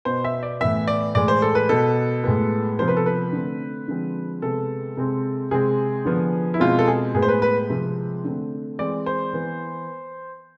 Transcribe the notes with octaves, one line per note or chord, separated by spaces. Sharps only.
B2 B3 C5
E5
D5
A2 E3 B3 E5
D5
A2 E3 G#3 D5
C5
A4
B4
B2 B3 A4
A2 G#3 B3
C3 F3 B3 C5
B4
A4
B4
D3 A3 C4
D3 F3 G#3 C4
C3 G#3 B3 A4
C3 G#3 C4
C3 G#3 C4 G#4
D3 F3 B3
E4
B2 G#3 C4 F4
A4
G#4
A2 G#3 B3 G#4
C5
B4
B4
C3 F3 G#3 C4
D3 A3 C4
E3 G#3 C4 D5
C5
E3 B3